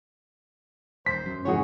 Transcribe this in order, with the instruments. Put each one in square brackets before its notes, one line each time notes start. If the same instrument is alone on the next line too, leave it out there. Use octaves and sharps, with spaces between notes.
[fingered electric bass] D#1 [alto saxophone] C5 [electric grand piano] B6
[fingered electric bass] F#2
[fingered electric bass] F2 G#2 C#3 [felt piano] E3 F#4 G#4 [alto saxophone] C#5